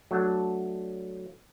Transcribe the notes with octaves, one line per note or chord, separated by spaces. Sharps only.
F#3 A3 D4